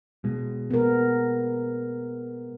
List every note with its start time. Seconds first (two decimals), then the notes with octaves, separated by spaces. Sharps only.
0.24 B2 G#3
0.71 B3 A#4